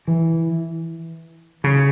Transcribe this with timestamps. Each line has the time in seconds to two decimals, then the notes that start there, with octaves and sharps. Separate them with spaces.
0.08 E3
1.64 C#3